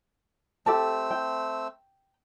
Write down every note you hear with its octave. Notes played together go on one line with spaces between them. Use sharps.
A3 C4 G4 A4 A5 E6
G5